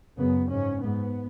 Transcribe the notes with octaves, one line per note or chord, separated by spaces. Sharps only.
F#2 C#3 B3
G#2 C#4
G#2 B3